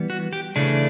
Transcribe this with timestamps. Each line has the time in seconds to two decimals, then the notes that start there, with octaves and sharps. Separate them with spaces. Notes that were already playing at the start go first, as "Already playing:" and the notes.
Already playing: E3 G3 B3
0.10 F#4
0.33 G4
0.56 C#3 E3 A3 D4 G#4